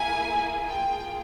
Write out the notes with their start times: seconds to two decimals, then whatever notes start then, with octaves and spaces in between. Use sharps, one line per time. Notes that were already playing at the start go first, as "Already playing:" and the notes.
Already playing: A#3 E4 G#4 G#5
0.67 A#3 F4 G#4 G5